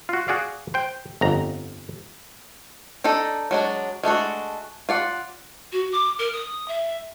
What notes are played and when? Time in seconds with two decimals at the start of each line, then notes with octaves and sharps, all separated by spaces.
0.09 F4 F#4
0.28 F#4 G#4 D5 F5
0.74 C5 G5
1.21 G1 F2 A#5
3.04 D4 D#4 A4 D#5
3.51 F#3 G#3 D4
4.03 G#3 A3 D4 F#4
4.89 F4 D5 F#5
5.72 F#4
5.92 D6
6.19 A#4
6.33 D#6
6.68 E5